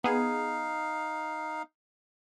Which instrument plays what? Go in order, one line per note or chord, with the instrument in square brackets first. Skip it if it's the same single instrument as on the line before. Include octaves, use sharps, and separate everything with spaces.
[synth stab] B3 G#4 [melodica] D#4 F5